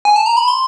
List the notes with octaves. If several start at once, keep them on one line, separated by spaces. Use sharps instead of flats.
G#5
A5
A#5
B5
C6